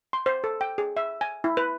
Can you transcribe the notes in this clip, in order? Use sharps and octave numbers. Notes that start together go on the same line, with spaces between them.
C6
C5
A4
G5
G#4
E5
G#5
E4
B4